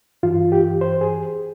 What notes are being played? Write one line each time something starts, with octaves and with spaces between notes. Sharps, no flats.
G2 E3 F4
G4
C5
G#4